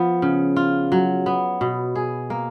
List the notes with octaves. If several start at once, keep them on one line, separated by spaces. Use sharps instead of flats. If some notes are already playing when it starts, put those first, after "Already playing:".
Already playing: F3 B3
C#3
F4
F#3
B3
B2
G#4
A#3